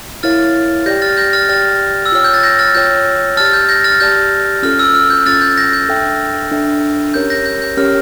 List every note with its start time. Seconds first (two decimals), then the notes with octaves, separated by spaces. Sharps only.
0.23 E4 A#4 C#5 F5 F6 A6
0.86 G4 D5 G5 G6 A#6
1.02 F6 A6
1.17 G6 A#6
1.33 F6 A6
1.49 G4 D5 G5 F6 A6
2.06 E6
2.12 F4 C#5 G5 F6
2.24 G6
2.34 A6
2.43 G6 A#6
2.59 F6 A6
2.75 F4 C#5 G5 G6
3.37 G4 D5 A5 F6 A6
3.53 G6
3.69 G6 A#6
3.84 F6 A6
4.00 G4 D5 A5 G6
4.63 C#4 F4 A4 F6
4.79 E6
4.94 F6
5.10 G6
5.26 C#4 F4 A4 F6 A6
5.42 G6
5.58 G6 A#6
5.73 G6
5.89 D4 A4 E5 G5
6.51 D4 A4 E5 G5
7.14 C#4 G4 A#4 C#5 G6
7.30 G6 A#6
7.46 G6
7.62 G6
7.77 C#4 G4 A#4 C#5 F6